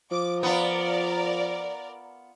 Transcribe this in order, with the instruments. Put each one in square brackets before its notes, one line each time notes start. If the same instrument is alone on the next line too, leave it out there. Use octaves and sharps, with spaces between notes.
[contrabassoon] F3 [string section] D6
[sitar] B3 F4 [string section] A#4 D5